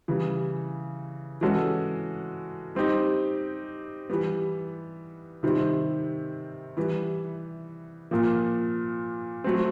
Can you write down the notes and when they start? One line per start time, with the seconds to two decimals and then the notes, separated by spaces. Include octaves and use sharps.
0.08 C#3 E3 G3
1.41 E3 G#3 C#4 F#4 A4
2.75 G3 C4 D#4 G4
4.10 E3 G3 B3
5.43 C3 D#3 G3 C4
6.77 E3 G3 B3
8.11 A#2 F3 A#3
9.44 F#3 A3 C4